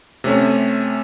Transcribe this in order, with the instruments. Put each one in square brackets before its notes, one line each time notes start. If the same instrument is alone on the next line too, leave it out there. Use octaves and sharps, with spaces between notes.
[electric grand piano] C3 A3 C#4